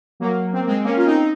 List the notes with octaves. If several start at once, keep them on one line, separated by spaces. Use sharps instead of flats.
F#3 A#3
C4
A#3
G#3 C4
A#3 C#4
F4
C4 D#4